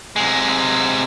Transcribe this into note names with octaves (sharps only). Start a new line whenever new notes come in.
C3 G#3